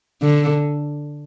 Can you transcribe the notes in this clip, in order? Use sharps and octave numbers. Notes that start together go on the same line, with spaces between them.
D3